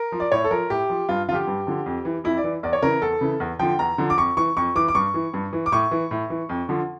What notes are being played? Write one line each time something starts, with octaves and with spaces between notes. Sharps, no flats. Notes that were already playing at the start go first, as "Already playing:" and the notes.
Already playing: A#4
F3
D5
A2 C#5
A4
F3 A#4
A2 G4
F3
G2 F4
D3 F3 F4 G4
G2
D3 F3
F2
E3
F2 E4
D5
E3
E2 D5
C#5
C#3 E3 A#4
E2 A4
C#3 E3
E2
D3 F3 G5
E2 A#5
D3 F3
D6
F2 C#6
E3 C#6
F2 C#6
E3 D6
D6
G2 C#6
E3
G2
E3
D6
A2 C#6
E3
A2
E3
F2
D3 F3